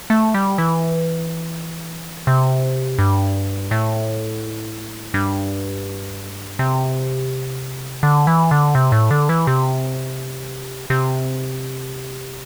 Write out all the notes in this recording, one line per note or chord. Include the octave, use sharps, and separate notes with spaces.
A3
G3
E3
C3
G2
A2
G2
C3
D3
E3
D3
C3
A2
D3
E3
C3
C3